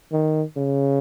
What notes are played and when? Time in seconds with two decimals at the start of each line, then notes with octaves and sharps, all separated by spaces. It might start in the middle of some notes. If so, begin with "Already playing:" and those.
0.12 D#3
0.56 C#3